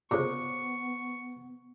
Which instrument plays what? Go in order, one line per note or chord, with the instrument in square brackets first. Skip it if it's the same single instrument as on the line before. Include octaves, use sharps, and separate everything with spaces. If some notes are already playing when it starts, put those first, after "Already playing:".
[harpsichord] A#2 C#3 [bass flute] B3 [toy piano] C5 D6 [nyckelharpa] C#6